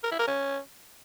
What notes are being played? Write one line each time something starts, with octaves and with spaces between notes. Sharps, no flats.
A#4
E4
A#4
C#4